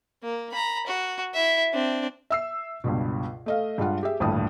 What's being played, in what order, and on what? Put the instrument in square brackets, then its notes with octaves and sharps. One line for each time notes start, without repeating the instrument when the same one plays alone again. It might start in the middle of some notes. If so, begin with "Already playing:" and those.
[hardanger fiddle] A#3
A#5 B5
F#4
E4 E5
C4 D4
[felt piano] E5 E6 C7
C#2 G2 B2
A3 D#5 F5
G2 G#3 F4 F#5
G4 G#4 E5
D#1 A1 D2 G2 A5 D#6